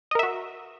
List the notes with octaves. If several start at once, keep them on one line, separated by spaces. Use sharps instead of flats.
F#4 A#4 D#5 E5